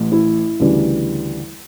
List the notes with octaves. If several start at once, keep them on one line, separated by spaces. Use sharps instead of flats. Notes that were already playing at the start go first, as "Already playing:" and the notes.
Already playing: A1 A2 E3
E4
D2 C#3 E3 G3